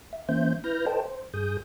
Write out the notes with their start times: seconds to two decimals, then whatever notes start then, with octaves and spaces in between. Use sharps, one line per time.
0.13 E5
0.29 E3 A#3 C#4 C5 E5 G6
0.64 E4 B4 F6 G6 A#6
0.86 A4 B4 C5 D#5 G5 A5
1.06 C5
1.34 G2 G#4 D#6 G6